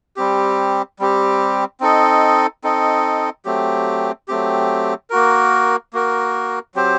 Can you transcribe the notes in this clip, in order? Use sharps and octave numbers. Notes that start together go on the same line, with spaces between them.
G3 C4 G4
G3 C4 G4
C4 D#4 A4 D#5
C4 D#4 A4 D#5
F#3 A3 C4 G4
F#3 A3 C4 G4
A#3 F#4 A#4
A#3 F#4 A#4
F#3 C4 G4 C5